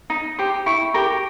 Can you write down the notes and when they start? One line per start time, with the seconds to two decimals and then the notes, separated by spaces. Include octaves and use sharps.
0.10 D#4
0.39 G4 C5
0.66 E4 C#6
0.94 G4 A#4